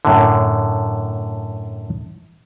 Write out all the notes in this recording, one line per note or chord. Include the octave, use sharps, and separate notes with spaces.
F#2 A2 D3